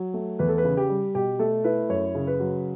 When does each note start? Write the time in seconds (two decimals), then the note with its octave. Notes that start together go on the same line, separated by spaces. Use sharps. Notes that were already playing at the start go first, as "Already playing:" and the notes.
Already playing: F#3
0.14 A3
0.39 E2 B4
0.49 A4
0.58 B4
0.64 C#3
0.77 G4
0.89 G3
1.15 B2 G4
1.39 A3 A4
1.64 E4 B4
1.89 F#2 C#5
2.15 C#3
2.27 B4
2.40 F#3